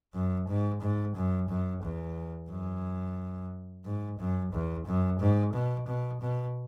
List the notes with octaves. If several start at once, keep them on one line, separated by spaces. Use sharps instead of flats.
F#2
G#2
G#2
F#2
F#2
E2
F#2
G#2
F#2
E2
F#2
G#2
B2
B2
B2